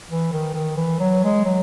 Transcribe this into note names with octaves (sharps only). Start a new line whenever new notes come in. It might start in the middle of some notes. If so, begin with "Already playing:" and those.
E3
D#3
D#3
E3
F#3
G#3
F#3